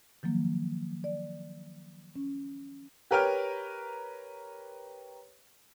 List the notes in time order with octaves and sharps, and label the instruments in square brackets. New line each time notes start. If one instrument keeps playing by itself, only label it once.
[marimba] D#3 F3 F#3 A#3
D5
C#4
[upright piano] G4 A#4 B4 C#5 G5 F6